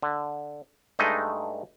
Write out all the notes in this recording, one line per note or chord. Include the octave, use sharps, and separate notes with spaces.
D3
G2 G#3 A3 D#4 D#5